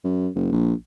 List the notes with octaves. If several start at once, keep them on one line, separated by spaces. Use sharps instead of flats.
F#2
F#1
A#1